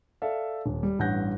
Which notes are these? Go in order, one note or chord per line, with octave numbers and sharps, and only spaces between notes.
A4 D5 E5 F5
D#1
G3
A1 G2 F#5 F#6 G6 A#6